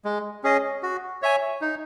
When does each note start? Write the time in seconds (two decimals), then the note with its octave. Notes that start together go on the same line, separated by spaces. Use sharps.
0.05 G#3
0.44 C#4 G#4 D#5
0.83 F#4
1.22 C#5 E5 G#5
1.61 D#4